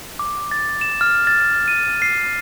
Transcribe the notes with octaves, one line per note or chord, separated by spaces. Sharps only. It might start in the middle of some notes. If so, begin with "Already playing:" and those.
D6
A6
E7
F6
A6
D#7
C7